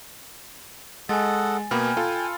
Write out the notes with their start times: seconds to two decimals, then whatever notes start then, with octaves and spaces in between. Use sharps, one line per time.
1.09 G#3 A4 D#5 F#5 G#5 A6
1.71 B2 A#3 B3 G5 G#5 B5 F6
1.97 F4 A4